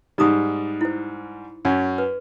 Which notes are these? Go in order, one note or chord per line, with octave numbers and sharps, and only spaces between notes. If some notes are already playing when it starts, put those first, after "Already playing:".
G#2 G3 D#4 A#5 D#6
E4 C5
F#2 C#4
B4